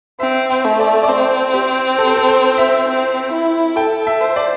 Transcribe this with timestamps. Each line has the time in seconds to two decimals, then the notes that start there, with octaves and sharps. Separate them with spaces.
0.20 C4 E5
0.50 G5
0.64 A3
0.80 D5
1.03 D5
1.08 C4 C5
1.54 G4
1.98 A4
2.07 C5
2.17 A4
2.29 C5
2.58 E5
2.88 C4
3.32 E4
3.76 A4 G5
4.07 E5
4.21 C5
4.36 D5